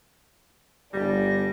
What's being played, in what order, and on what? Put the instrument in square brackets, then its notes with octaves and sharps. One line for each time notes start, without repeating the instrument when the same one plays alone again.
[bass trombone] G1 [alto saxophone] G3 [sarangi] D4 [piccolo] A#6